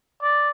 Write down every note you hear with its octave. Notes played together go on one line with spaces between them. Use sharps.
D5